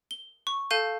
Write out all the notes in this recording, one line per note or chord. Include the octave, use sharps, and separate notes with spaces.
G7
C#6
A4 F5 A5 G6 D#7